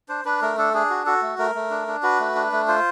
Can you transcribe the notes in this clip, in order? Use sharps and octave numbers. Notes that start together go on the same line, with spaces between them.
D4 C5
D4 B4
A3 A#4
D4 A4
D4 G#4
F#4
F#4 A4
A3
A3 A#4
A3
D4
D4
F#4 B4
A3
D4
A3
F4 C5